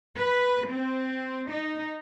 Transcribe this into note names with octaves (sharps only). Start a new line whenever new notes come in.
B4
C4
D#4